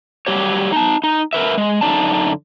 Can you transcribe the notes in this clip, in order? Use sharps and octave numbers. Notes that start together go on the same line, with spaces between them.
F#3 G3 G4 C#5
D#4 A5
D#4
A#4 B4 E5
G#3
F#2 D3 D#4 D5 A5